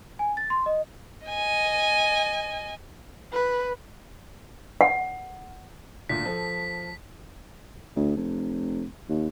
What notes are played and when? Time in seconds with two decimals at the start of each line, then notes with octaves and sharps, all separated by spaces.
0.19 G#5
0.37 A6
0.50 C6
0.66 D#5
1.27 D#5 G#5
3.33 B4
4.81 F#5
6.09 D2 A#2 B6
6.25 F3 A4
7.96 D2
8.17 F1
9.09 D#2